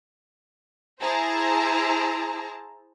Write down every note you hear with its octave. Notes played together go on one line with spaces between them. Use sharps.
E4 G#4 C5 A5 A#5